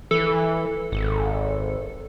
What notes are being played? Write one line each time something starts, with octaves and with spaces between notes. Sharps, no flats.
E3 A4
G#1